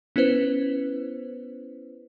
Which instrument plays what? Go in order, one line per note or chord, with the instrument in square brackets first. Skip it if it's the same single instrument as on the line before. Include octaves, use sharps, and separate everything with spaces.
[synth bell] B3 C#4 E4 B4 C5